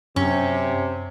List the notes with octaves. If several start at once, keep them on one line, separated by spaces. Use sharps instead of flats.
F#2 C3 C#4